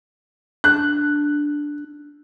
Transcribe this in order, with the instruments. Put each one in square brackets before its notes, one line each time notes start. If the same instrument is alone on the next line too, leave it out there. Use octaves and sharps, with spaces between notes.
[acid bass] D4 [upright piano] F#6